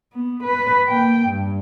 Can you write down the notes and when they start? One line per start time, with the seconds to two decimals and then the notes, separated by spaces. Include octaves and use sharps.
0.13 B3
0.44 B4
0.87 A#3 G5
1.26 G2